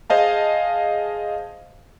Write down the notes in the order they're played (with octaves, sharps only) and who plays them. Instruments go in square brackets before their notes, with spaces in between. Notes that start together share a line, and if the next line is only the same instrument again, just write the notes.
[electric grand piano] G#4 C5 D#5 F5 A5